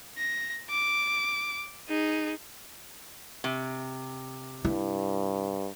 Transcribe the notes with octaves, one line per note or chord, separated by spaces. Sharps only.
A#6
D6
D#4 G#4
C3
G2 E4